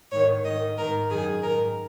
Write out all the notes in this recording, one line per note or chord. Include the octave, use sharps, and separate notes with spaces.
G#2 D#3 C#5
G#2 D#3 D#5
G#2 D#3 A#4
F#2 D#3 G#4
G#2 D#3 A#4